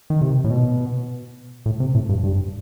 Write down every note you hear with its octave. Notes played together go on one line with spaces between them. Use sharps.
D#3
C3
A2
B2
A2
C3
A2
G2
G2